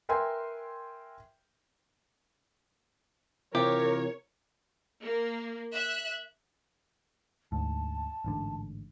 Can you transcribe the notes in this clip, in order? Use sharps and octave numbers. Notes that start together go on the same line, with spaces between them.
A#4 B4 E5 G5 G#5 C6
C3 E3 F4 G4 A#4 C#5
A#3
E5 F#6
D2 G#2 A5
A1 G#2 D3